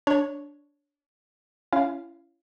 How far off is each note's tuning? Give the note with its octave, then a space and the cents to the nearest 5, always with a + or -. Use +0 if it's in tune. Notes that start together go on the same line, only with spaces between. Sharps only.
D4 -15 C#5 +0
C#4 +15 E4 +35 F5 +0